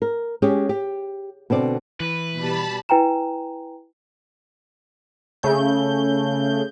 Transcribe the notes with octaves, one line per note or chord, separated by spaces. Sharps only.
A#4
G#3 C#4 G4 G#4
G4
B2 D3 C4 D5
E3 B4
B2 G3 A5 B5
E4 B4 G5 G#5 A#5 E7
C#3 A3 G6